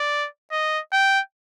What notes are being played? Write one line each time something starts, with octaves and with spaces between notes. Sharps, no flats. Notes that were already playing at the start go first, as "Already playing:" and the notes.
Already playing: D5
D#5
G5